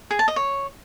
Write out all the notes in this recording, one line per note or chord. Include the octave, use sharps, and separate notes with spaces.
G#4
A5
D#5
C#5